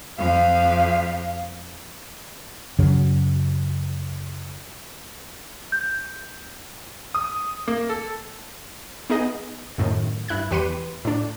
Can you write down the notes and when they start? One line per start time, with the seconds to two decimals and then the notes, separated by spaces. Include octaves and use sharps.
0.18 F2 F5
2.79 F#2 C#3 F#3
5.72 G6
7.14 D#6
7.68 A#3
7.89 A4
9.10 B3 D#4 G#4 D#5
9.78 F#2 A2 D#3
10.28 G2 E4 F#6 G#6
10.51 E2 G4 B4 C6 C#7 D#7
11.05 A2 D4